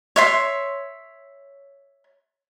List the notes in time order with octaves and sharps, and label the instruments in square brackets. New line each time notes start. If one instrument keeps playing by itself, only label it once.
[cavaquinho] C#5 E5 C6